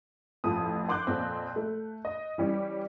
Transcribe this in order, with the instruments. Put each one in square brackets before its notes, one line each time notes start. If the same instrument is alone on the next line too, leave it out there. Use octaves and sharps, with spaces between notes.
[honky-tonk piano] A1 F2 F3 D#6
F#5 C6 D6 F#6 G6
F2 A#2 C4
A3
D#5
E3 G3 C#4